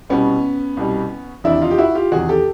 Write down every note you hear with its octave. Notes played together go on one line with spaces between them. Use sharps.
C2 B2 G3 B3 C#4
C2 B2 G3
E2 C3 D#3 D4 E4
D#4 F4
G4
E4 F#4
F4 G4
E2 C3 D#3 F#4 G#4
G4 A4